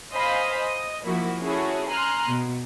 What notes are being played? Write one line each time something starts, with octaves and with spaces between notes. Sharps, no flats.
C5 D#5 F5 G#5 B5
D#5
F3 A#3 E4 F#4
C#4 E4 F#4 G#4 A4 C#5
G#5 A#5 C6 F6 F#6
B2